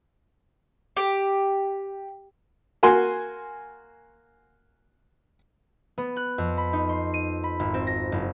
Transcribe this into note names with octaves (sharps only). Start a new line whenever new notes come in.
G4
A#3 F#4 G#5 C6
B3
F#6
F2
B5
D#4
C6
D#7
B5
G#1
C4
A#6
F#1